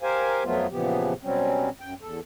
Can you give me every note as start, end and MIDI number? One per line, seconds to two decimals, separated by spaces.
0.02 0.44 67
0.02 0.44 70
0.02 0.44 72
0.02 0.44 77
0.02 0.44 80
0.44 0.67 41
0.44 0.67 53
0.44 0.67 54
0.44 0.67 57
0.44 0.67 59
0.44 0.67 65
0.71 1.13 46
0.71 1.13 49
0.71 1.13 52
0.71 1.13 53
0.71 1.13 59
0.71 1.13 67
1.23 1.69 47
1.23 1.69 54
1.23 1.69 55
1.23 1.69 60
1.23 1.69 61
1.81 1.94 42
1.81 1.94 79
2.01 2.20 40
2.01 2.20 69